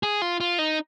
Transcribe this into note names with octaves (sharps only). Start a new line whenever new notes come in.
G#4
F4
F4
D#4